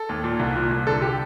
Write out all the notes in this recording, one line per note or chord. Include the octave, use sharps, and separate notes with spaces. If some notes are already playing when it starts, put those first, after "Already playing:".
Already playing: A4
D#2
A#2
C2
A#2
C2
D3 A4
G4